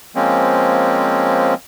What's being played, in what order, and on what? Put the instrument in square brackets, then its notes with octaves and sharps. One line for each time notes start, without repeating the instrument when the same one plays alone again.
[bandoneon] F3 G#3 A#3 C4 C#4